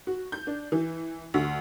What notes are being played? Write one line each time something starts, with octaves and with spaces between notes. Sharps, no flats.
F#4
G6
D4
E3
D2